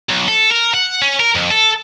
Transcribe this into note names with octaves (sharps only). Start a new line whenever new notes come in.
B1
A4
A#4
F#5
C#4
A#4
F2
A4